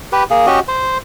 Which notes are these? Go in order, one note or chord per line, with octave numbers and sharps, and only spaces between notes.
G4 B4
A#3 G#4
C#4 F#4 G4 D#5
C5